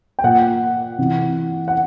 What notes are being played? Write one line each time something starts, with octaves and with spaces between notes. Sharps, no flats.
G5
A#2 F#5
C3 E3
F#5